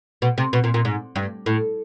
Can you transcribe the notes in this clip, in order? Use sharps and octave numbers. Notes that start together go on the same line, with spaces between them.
B2
C3
B2
A#2
A#2
G#2
G2
A2